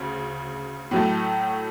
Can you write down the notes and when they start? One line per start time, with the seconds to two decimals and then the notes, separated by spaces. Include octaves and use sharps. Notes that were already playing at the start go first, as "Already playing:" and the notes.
Already playing: D2 C#3
0.91 A2 F#3 A3